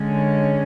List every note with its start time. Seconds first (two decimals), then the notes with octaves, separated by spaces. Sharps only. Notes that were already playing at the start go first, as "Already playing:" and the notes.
Already playing: D3 G#3 C#4